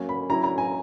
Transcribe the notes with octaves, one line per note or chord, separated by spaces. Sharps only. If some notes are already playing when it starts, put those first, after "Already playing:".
Already playing: F#3 A#3 C#4
B5
F#3 C#4 E4 A#5
A#5
G#5